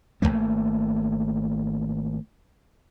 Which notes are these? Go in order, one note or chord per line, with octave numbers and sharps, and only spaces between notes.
G#1 A2 A3 A#3